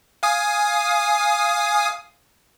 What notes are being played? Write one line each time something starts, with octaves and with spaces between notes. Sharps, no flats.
F5 G#5 D#6